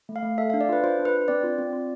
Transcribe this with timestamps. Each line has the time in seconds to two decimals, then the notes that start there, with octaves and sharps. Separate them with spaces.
0.09 A3
0.16 F5
0.23 A3
0.38 A4 E5
0.50 D4 F5
0.61 D5
0.69 F4 B4
0.84 F4 C5
0.99 D4
1.05 B4
1.13 D4
1.28 C4 D5
1.43 F4
1.58 C4
1.73 F4